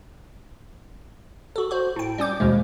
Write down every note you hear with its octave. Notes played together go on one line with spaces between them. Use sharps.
F#4 A4
F#4 C5
A2 G5
G3 C#4 D6 G6
D#2 B2 F3 G#3